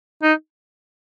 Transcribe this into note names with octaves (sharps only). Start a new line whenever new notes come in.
D#4